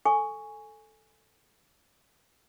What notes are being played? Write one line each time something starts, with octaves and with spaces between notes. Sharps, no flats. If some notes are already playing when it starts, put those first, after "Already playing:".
A4 G#5 C#6